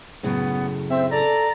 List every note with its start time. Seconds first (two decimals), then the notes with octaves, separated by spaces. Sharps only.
0.23 F#2 A2 C#3 B3
0.90 C4 E5
1.11 A4 D5 A#5